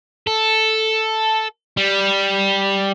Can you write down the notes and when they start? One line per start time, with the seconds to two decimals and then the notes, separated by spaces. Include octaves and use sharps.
0.27 A4
1.77 G3